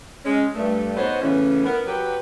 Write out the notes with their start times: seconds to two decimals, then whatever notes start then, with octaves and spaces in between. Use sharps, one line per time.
0.25 G#3 C#4
0.55 G2 A3
0.96 G#2 B3 F#4 C5 C#5 D#5
1.22 A2 C#3 E3 B3 C#4
1.65 B3 A#4
1.86 F#3 G4 B4